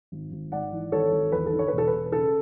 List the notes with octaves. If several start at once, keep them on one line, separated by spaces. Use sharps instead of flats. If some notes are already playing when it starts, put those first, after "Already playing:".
G#1
G#1
G#2 D5 F#5
E3
G#1 A4 C#5
G#1
E2 B4
A4
D3
C#5
B4
E1 A4
B4
E1
C#3 A4